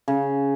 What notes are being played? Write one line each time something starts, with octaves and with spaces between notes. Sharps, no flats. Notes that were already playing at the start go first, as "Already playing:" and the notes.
C#3